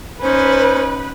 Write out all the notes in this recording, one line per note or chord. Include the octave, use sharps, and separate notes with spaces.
C#4 D#4 B4 C5